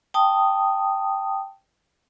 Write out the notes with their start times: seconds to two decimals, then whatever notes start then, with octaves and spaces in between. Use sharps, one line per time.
0.14 G5 A5 D#6